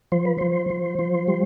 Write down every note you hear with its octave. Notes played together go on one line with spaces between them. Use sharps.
F3 C5
B4
F3 C5
F3
F3
G3